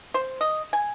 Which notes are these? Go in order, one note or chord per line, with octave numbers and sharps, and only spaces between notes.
C5
D#5
G#5